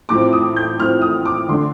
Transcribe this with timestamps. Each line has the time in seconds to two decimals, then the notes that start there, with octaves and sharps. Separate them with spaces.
0.09 A2 F3 C4 D6
0.33 D#6
0.56 G6
0.79 A2 F3 C4 F6
1.02 D#6
1.25 D6
1.48 D3 A3 D4 C6